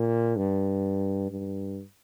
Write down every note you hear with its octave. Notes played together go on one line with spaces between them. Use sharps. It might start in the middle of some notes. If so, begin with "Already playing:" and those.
Already playing: A#2
G2
G2